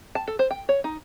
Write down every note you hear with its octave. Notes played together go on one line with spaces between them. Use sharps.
A5
A4
C5
G5
C#5
D#4